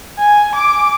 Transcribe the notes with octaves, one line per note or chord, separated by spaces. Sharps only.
G#5
D6